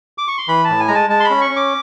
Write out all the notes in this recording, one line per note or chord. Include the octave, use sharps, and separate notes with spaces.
D6
C#6
C6
E3 B5
A5
A2
G#5
G#3 A#5
A5
G#3 A5
C6
B5
C#4
C#6
C#4
D6